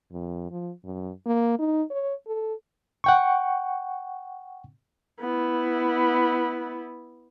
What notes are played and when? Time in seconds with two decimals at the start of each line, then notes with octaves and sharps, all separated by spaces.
0.12 F2
0.51 F3
0.84 F#2
1.26 A#3
1.59 D#4
1.91 C#5
2.27 A4
3.04 F#5 G5 C#6
5.21 B3 E4